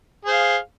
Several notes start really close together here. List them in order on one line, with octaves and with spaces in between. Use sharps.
G#4 C5 F5